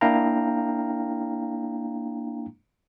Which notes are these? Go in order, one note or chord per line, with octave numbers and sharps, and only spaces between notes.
A#3 D4 E4 F5 G5 A#5